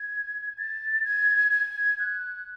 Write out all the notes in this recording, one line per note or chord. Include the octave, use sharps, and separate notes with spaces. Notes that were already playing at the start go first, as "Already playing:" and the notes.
Already playing: G#6
A6
G#6
G#6
F#6